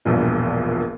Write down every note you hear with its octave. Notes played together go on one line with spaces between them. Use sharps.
E1 A#1 G2 A#2